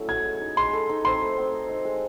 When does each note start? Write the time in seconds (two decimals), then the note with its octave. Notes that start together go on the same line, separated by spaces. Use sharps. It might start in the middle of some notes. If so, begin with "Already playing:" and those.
Already playing: F#3 A3 C#4 E4 A4
0.09 F#4 G#6
0.25 G#3
0.41 D#4
0.57 G#3 C6
0.73 A4
0.89 D#4
1.05 C4 C6
1.22 A3
1.38 C4
1.54 D#5
1.69 D#4
1.85 G#3